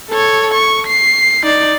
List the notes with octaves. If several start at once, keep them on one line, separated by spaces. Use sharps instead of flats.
A4 C#5
C#6
C7
D#4 D5